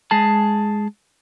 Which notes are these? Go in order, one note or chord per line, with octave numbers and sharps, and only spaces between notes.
G#3 G#4 A5